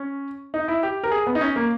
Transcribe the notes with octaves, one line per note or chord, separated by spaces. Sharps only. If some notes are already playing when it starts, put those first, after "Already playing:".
Already playing: C#4
D#4
E4
G4
A#4
G#4
B3
D#4
C#4
A#3